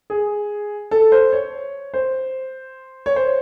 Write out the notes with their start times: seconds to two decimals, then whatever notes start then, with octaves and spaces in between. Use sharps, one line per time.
0.10 G#4
0.91 A4
1.12 C5
1.32 C#5
1.94 C5
3.06 C#5
3.16 C5